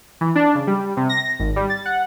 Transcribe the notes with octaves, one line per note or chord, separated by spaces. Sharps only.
E3
D4
C#3
G3
C3
A#6
G#1
G3
A6
F#5